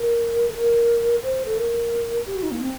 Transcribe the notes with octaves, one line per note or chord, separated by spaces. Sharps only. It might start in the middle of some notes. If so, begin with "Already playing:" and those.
Already playing: A#4
A4
A#4
C5
A4
A#4
G4
F#4
D#4
A#3
C4